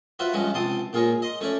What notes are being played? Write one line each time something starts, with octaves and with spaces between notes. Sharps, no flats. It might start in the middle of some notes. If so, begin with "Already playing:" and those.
F4 F#4 B4 C5 E5
G2 F3 G#3 C#4 F#4
C#2 C3 A5 C6 D#6
A#2 F4 G#4 C#5 A#5
D#5 C6
A3 C#4 C#5 D5